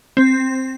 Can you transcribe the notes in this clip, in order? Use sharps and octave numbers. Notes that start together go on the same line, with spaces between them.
C4